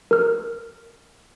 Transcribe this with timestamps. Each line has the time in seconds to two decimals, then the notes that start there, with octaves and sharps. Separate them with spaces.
0.11 A#4 F6